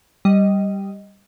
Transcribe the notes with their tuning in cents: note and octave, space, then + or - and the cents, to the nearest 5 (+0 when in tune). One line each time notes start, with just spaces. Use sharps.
G3 +0 D#5 +0